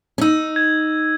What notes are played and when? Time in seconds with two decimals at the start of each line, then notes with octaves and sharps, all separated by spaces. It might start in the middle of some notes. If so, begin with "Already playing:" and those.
0.18 C#4
0.21 D#4 E6
0.56 G#6